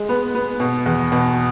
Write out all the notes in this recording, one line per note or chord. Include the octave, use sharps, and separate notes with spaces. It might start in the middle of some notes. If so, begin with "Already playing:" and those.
Already playing: G#3
B3
B3
B2
E2
B2